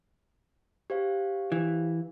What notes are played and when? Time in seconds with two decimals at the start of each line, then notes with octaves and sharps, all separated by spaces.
0.90 G4 C5 F5
1.52 E3